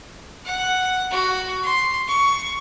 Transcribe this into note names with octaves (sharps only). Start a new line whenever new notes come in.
F#5
F#4
C6
C#6